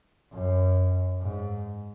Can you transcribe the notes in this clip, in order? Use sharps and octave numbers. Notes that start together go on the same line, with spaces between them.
F#2
G#2